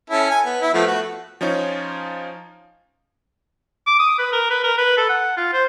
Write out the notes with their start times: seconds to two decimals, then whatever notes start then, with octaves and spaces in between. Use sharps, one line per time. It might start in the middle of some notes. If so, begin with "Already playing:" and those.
0.10 C#4 E4 A4
0.30 G#5
0.45 B3
0.62 E4
0.74 F3 A3 B3
0.87 A3 F#4
1.41 F3 C#4 D#4 F4 C#5
3.87 D6
4.00 D#6
4.19 B4
4.33 A#4
4.50 B4
4.64 A#4
4.78 B4
4.97 A4
5.09 F#5
5.37 F4
5.53 C5